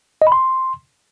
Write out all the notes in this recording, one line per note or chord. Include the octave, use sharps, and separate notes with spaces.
D#5
B5
C6